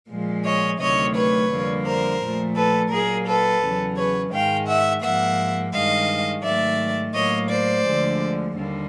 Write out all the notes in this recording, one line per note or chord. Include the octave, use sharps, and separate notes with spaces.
A#2 F3 G#3
C#5 D#5
D2 C3 D#3 F#3 A3 C#5 D#5
B4 C#5
F2 D3 G3 A#3
A#4 C5
A#2 F3 A3
A4 B4
A#2 F#3 A#3 G#4 A#4
A4 B4
E2 C#3 F#3
B4 C#5
G#2 D#3 G#3 F5 G5
E5 F#5
G#2 F3 A#3 E5 F#5
G2 D#3 G#3 D#5 F5
G#2 D#3 F#3 A3 D5 E5
A2 F#3 A#3 C#5 D#5
C5 D5
D2 D3 F3 G#3
D#2 D3 G3 A#3